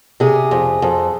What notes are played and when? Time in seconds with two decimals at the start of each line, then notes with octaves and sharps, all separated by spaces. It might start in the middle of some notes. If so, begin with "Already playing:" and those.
0.20 C3 G#4
0.51 F2
0.82 F2